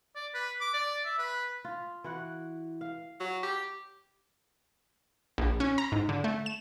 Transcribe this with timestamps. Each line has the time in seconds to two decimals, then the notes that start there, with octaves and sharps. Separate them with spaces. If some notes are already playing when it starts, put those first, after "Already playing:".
0.15 D5
0.34 B4
0.60 D6
0.74 D5
1.05 E5
1.18 B4
1.65 F4
2.04 E3 F#4 F#5
2.81 F5
3.20 F#3
3.43 G4
5.38 A#1
5.60 C#4
5.78 A#5
5.92 G#2
6.09 D3
6.24 A3
6.46 E7